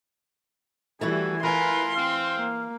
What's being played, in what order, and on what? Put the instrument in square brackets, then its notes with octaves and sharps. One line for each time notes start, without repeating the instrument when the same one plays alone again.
[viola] E3 G3 [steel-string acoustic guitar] A3 E4 F#4 [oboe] G#4
[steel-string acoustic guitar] E3 G#5 [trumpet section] E4 F4 A#4 [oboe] B4 [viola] C6
[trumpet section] C4 [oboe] F5
[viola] A#3